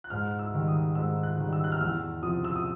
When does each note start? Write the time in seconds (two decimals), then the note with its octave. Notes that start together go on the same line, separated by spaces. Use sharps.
0.04 F#6
0.10 G#2 F6
0.39 E6
0.53 D#3 G3
0.68 D#6
0.95 G#2 E6
1.23 F#6
1.38 D#3 G3
1.53 E6
1.64 F#6
1.72 F6
1.81 E2 E6
2.22 C3 F3 D#6
2.44 E6
2.56 D#6